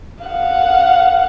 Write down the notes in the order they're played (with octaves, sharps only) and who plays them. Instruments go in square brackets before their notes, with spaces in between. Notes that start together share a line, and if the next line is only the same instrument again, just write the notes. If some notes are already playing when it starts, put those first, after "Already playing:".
[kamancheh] F5 F#5